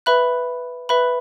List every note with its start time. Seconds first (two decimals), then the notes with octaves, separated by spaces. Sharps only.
0.06 B4 E5 B5 F#6
0.89 B4 E5 B5 F#6